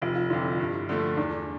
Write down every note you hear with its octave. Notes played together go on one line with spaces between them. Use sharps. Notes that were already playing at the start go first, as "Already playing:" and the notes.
F1 F4
F4
F2 D3 E4
G2
D3 F3 A3
E2 D4